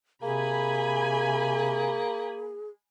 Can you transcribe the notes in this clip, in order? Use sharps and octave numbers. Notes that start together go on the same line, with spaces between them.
C3 A#3 G#4 G#5 B5